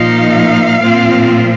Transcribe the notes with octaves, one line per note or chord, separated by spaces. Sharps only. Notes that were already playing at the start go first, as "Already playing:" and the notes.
Already playing: A#2 F3 D#4 F5
A#2 F3 C4 F4